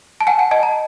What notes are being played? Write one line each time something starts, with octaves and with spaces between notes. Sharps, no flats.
A5
F#5 G#5
G#5
D#5 A5
A#5